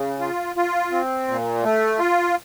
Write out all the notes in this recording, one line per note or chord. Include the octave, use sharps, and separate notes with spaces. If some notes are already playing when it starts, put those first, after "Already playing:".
Already playing: C#3
F4
F4
C4
A#2
A3
F4